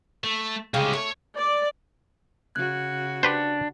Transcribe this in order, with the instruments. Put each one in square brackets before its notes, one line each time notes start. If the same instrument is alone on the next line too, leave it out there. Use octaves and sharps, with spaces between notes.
[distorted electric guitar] A3
[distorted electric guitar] C2 G#3 [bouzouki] C#3 G4
[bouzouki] A3 [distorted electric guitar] C#5
[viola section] D5
[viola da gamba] C#3 F#4 [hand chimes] F#6 G#6
[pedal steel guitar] D4 [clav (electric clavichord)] G4 B4 C5